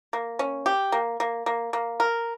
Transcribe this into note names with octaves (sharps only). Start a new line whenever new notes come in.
A#3
C#4
G4
A#3
A#3
A#3
A#3
A#4